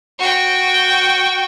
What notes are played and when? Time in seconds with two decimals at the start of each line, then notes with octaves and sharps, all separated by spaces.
0.19 F#4 G5